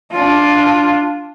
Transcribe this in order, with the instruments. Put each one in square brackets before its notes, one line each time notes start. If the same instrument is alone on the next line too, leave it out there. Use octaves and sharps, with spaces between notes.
[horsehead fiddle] D4 F4